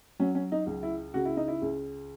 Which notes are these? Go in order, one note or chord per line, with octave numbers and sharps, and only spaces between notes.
F#3 C#4
C#4
D#4
C#2
E4
C#3 F#4
E4
D#4
E4
C#2